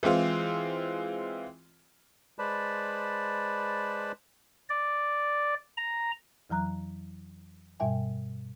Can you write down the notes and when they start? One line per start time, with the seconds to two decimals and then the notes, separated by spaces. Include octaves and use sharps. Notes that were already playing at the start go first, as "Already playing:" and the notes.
0.03 E3 G#3 C4 F4
2.39 G#3 B4 C5 D5 A5 B5
4.70 D5
5.77 A#5
6.49 F2 E3 F#3 A#5 F#6
7.80 G2 B2 G3 E5 G5 G#5